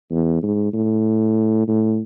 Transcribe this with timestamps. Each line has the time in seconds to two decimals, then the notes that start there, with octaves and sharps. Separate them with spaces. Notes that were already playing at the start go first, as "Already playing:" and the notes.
0.11 E2
0.43 G#2
0.73 A2
1.68 A2